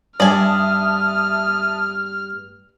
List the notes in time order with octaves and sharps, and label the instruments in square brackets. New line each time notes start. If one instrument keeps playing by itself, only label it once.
[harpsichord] G2 [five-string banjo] D5 G#5 [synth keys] E5 A5 D#6 [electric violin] F6